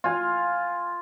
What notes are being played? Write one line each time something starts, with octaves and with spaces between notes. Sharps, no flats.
F4 G#5